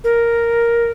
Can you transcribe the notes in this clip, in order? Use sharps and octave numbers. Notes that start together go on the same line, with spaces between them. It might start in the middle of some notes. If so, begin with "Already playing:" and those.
A#4